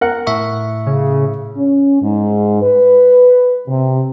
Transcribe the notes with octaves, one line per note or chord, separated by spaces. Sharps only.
A#4 F#5
A2 E5 C#6
C#3
C#4
G#2
B4
C3